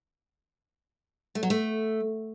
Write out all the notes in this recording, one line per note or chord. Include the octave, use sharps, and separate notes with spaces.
A3
F#3
A3